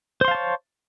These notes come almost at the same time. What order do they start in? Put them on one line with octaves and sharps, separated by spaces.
C5 C6 F5 A5 C#5